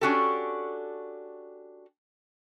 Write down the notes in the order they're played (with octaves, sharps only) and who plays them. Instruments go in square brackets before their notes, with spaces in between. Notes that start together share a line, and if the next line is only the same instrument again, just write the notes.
[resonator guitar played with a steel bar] C#4 D4 F#4 G4 A4